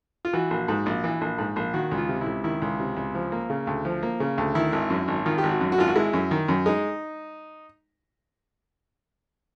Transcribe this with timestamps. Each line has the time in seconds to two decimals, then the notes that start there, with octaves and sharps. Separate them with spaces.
0.25 F4
0.33 E3 F#4
0.50 A#1
0.68 G#2
0.86 A#1
1.04 E3
1.21 A#1
1.38 G#2
1.56 A#1
1.74 D#3 F#4
1.91 C#2
1.98 F4
2.09 C3
2.21 E4
2.26 C#2
2.44 D#3 E4
2.62 C#2
2.80 C3
2.97 C#2
3.15 F3
3.32 A#3
3.50 C#3
3.67 D2
3.85 F3
4.03 A#3
4.20 C#3
4.38 D2
4.55 D#3 E4
4.72 G#1
4.90 F#2
5.08 G#1
5.26 D#3 F4
5.38 G4
5.43 G#1
5.49 F#4
5.61 F#2
5.72 F#4
5.78 G#1 F4
5.88 F#4
5.96 G#3 E4
6.13 F#2
6.31 D#3
6.48 F#2
6.66 G#3 D#4